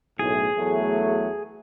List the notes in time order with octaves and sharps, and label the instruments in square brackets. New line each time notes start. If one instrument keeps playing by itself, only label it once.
[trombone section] B1 A2 [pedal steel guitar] G#4
[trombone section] E2 F#3 A3